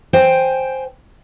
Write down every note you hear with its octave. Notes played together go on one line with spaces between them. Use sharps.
C5 G5 G#5